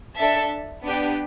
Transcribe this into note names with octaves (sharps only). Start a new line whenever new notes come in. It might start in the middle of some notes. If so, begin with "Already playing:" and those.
D4 A4 E5 A5
B3 D4 G4